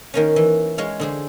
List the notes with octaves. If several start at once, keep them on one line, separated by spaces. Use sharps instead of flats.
D#3 A#3 C#4
E3
G#3 C#5 F5
D3 G#4 C5